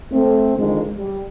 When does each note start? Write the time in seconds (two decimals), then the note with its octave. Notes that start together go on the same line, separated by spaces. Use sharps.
0.12 A3 C4
0.57 F2 D3 D#3 G#3
0.97 G3